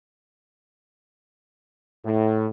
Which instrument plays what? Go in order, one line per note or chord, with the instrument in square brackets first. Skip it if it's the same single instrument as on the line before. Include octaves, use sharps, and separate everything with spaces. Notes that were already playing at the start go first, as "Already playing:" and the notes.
[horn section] A2